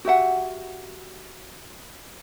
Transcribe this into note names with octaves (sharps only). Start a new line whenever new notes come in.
F#4 G4 E5 F#5